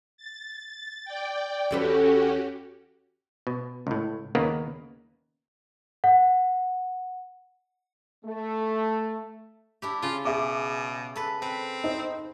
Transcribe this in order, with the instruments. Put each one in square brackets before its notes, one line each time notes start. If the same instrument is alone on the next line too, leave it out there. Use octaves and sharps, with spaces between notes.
[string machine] A6
D5 G5
[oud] E2 A4 B4 [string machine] C#4 F#4 G4
[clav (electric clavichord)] B2
C#2 A2
D#2 C#3 A#3 B3 A#4 B4
[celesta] F#5
[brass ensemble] A3
[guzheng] D4 E4 G4
[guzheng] C#3 [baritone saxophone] F4
[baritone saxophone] B2 [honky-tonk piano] G#4 E5 D6
[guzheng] A4 B4
[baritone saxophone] C4 [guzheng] B4
[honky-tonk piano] D#4 C5